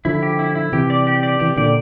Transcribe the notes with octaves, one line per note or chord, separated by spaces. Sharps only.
D3 F3 E4
G4
E4
E4
C3 E3 G4
D5
G4
D5
C3 E3 G4
A#2 D3 D5